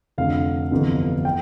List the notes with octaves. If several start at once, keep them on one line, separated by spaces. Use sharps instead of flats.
F1 F2 D3 F5
G1 F2 C3 E3
G5